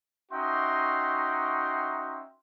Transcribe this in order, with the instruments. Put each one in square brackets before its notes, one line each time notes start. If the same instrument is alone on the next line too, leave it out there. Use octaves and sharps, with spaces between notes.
[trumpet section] C#4 D#4 F#4 E5 G5 C6